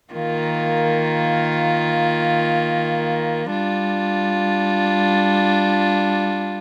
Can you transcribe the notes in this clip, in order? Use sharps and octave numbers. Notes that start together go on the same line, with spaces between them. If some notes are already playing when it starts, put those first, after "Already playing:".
D#3 A#3 F4
G3 D4 F4